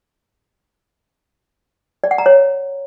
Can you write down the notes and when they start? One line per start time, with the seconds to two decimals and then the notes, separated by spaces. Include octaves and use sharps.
2.04 D5
2.11 F#5
2.18 A#5
2.26 C#5